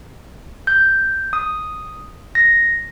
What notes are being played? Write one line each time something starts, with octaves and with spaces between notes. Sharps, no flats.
G6
D#6
A#6